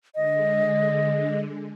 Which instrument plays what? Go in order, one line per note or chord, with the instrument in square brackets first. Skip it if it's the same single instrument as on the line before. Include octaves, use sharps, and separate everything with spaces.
[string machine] D3 G#3 [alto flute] D#5